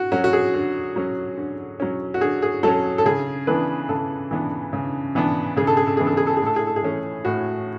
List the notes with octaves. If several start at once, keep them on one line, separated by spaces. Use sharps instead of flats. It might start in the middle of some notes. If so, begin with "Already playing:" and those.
Already playing: F#4
F#3 C#4 F#4
F#4
G#4
D3
F#3 C#4
D3
F#3 C#4
F#4
D3 G#4
G#4
F#3 C#4 A4
A4
C#3 G#4
E3 B3 D4 B4
C#3 A4
E3 B3 D4
C#3
E3 B3 D4
C#3 G#4
A4
G#4
A4
E3 B3 D4 G#4
A4
G#4
A4
A2 G#4
A4
G#4
A4
G#4
E3 A3 C#4
A2 F#4